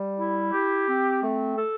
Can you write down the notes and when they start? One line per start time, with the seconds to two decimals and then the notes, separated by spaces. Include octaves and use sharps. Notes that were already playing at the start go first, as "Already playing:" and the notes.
Already playing: G3
0.18 E4
0.52 G4
0.87 C4
1.22 A3
1.57 A4